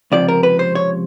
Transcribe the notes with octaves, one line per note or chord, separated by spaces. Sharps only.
C#2 C3 F3 D5
A#4
B4
C5
C#5